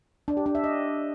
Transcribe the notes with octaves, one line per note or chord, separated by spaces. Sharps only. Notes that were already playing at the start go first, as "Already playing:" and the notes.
D4
G4
D4
E5
D#5